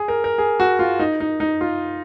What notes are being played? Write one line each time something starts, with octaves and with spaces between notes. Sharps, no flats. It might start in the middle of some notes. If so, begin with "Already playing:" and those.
Already playing: G#4
A#4
A#4
G#4
F#4
F4
D#4
D#4
D#4
F4